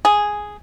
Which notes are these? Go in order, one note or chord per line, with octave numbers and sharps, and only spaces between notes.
G#4